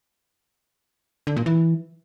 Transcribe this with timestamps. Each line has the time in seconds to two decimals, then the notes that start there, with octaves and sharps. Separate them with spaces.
1.27 D3
1.36 A#2
1.46 E3